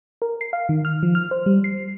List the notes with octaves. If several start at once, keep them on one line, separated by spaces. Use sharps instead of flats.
A#4
C7
F5
D#3
F6
F3
F6
C5
G3
C7